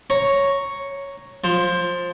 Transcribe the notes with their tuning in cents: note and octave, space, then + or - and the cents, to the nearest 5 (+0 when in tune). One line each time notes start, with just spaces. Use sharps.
C#5 +0 A#5 +0 C#6 +0
F3 +15 C6 +0